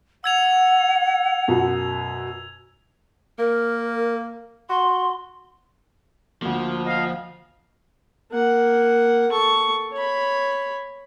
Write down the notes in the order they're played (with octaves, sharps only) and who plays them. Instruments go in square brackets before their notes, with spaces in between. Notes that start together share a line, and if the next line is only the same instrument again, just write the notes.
[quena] F#5 [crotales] E6 G#6 F7
[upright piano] F#2 B2
[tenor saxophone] A#3 [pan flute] A#4
[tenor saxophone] F#4 [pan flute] C6
[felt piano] D2 A#3 [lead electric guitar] F3
[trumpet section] D#5 F5
[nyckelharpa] A#3 F#5
A4 C#6
C#5 B5